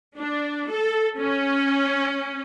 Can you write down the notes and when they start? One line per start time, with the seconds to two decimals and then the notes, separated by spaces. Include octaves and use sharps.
0.19 D4
0.69 A4
1.17 C#4